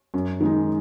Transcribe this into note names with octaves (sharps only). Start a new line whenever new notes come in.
F#2
D#3 G#3 D#4